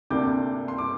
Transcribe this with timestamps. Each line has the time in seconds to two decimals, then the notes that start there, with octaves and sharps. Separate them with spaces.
0.10 D2 C3 A#3 D4 D6 G6
0.68 C6
0.78 D6